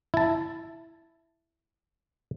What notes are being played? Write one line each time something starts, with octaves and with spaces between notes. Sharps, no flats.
E4 A5